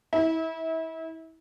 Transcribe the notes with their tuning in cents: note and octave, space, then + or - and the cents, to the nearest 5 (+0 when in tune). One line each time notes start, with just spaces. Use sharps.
E4 -30